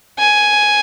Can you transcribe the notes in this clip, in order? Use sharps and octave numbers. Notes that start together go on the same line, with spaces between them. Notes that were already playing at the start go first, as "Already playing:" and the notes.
G#5